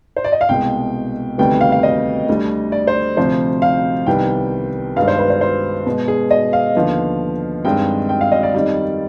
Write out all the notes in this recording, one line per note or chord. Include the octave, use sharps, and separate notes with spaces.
C5
D5
D#5
F5
C2 B2 G#3 G5
D2 C3 D#3 G3 B3 G5
F5
F5
D#5
D2 D3 G3
D5
C5
D2 C3 F3 C5
F5
C2 C3 D#3 G3 B3 G5
G2 D#3 G#3 B3 F5
C5
B4
C5
C5
B2 G#3 B3
G#4
D#5
F5
D#2 D3 F3 B3
G2 D#3 G#3 C4 G5
G5
F5
D#5
D5
F2 D#3 G3